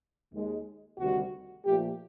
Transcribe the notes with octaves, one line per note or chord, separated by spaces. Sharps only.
D#2 D#3 G#3
D2 C3 D#3 G3 F#4
A#2 F3 A3 G4